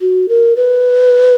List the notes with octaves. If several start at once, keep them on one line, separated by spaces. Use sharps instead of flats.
F#4
A#4
B4